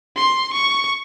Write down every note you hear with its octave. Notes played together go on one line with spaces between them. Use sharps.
C6
C#6